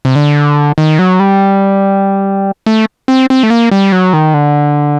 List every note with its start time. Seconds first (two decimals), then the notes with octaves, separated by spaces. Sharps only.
0.05 C3
0.16 D3
0.78 D#3
0.99 F#3
1.19 G3
2.66 A3
3.08 C4
3.30 C4
3.43 A3
3.50 A#3
3.71 G3
3.92 F#3
4.13 D#3
4.34 D3